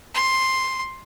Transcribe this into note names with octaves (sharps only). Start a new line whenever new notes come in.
C6